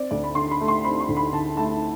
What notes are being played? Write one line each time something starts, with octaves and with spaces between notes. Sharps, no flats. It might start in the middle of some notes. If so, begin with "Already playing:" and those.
Already playing: C4 D5
D2 D5
B5
D3 C6
B5
A3
C6
C4 B5
C6
D2
B5
D3 A5
A3 A5